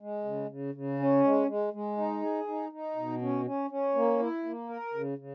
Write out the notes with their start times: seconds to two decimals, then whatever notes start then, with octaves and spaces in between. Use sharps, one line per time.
0.01 G#3
0.25 C#3
0.49 C#3
0.74 C#3
0.99 C#4
1.24 G#3
1.48 G#3
1.73 G#3
1.97 D#4
2.22 G#4
2.48 D#4
2.72 D#4
2.96 B2
3.22 C#4
3.46 C#4
3.70 C#4
3.95 A#3
4.19 E4
4.45 A#3
4.69 A#4
4.94 C#3
5.18 C#3